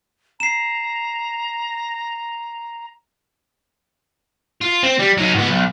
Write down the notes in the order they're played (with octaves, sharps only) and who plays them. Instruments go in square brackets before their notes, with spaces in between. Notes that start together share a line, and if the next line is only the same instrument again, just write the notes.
[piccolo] A#5 [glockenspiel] C7 E7
[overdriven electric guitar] F4
C4
G3
F#3 D#4
G#2 B3
B1